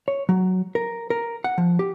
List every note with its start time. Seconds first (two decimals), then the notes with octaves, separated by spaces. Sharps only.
0.08 C#5
0.29 F#3
0.75 A#4
1.10 A#4
1.44 F#5
1.58 F3
1.79 G4